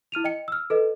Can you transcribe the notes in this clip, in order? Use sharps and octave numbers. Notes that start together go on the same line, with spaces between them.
E4 F6 D#7 F7
D#5 G5 C#7
E6 F6
A4 B4 D#5